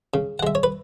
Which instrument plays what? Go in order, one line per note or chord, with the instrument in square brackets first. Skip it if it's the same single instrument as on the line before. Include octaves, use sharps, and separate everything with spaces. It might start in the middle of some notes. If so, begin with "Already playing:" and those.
[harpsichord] C#3
F#5
G#3 E5
C#5
B4